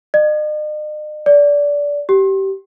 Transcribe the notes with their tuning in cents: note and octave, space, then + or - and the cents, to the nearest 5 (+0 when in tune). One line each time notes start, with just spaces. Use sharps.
D#5 -45
D5 -20
G4 -20